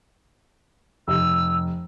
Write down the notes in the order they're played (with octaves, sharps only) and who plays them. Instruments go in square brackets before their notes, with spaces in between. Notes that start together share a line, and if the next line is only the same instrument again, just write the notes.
[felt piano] F1 [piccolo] E6